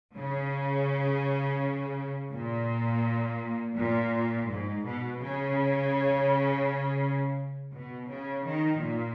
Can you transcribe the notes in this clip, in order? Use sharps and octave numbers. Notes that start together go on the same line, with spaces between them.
C#3
A#2
A#2
G#2
B2
C#3
B2
C#3
D#3
A#2